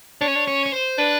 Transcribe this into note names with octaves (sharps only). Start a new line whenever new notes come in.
D4 C#5
C#4
D4
C#4 C#5
C#5
C5
D4 B4